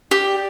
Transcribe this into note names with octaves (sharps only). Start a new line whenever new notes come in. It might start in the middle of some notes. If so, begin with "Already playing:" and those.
G4 D5